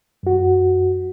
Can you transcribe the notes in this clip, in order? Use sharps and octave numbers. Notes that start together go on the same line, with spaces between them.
F#2 F#4